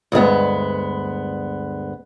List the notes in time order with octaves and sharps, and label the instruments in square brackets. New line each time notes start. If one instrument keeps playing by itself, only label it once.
[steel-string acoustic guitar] D2 G2 G#3 B3